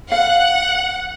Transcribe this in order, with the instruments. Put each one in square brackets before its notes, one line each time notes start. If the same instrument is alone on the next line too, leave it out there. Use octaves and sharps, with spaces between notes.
[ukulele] F5 [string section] F#5